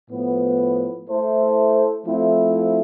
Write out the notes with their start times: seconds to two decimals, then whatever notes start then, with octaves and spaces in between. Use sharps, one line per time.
0.10 A2 F3 B3
1.07 A3 E4 A4 C5
2.06 F3 A3 C4 E4